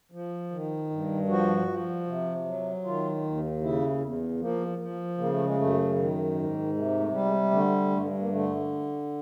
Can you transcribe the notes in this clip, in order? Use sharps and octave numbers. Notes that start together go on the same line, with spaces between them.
F3
D#3
G2
F3 F#4
F3
C3
F#3
D#3 F4
D#2
C#3 E4
E2
F3 A#3
F3
C#3 A#3
A3
G#3
F#2 A3
D#3
G#2
C3 G#3
A3
G3
G#3
D3 A3
G2 A3
A#3
D3 A3